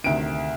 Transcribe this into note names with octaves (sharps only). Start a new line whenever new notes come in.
D2 C3 D#3 D7